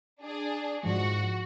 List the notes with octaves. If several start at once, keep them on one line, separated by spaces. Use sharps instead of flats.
D4 G#4
G#2 F3 G#3 F#4